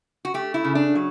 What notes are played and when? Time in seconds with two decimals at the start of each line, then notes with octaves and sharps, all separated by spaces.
0.25 F#4
0.34 A3 G4
0.54 E4
0.64 C#3
0.75 D4
0.95 F#3